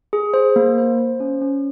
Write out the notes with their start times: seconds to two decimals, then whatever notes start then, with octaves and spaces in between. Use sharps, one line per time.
0.13 G#4
0.34 C5
0.56 A#3
0.78 C5
0.98 C5
1.20 C#4
1.41 C#4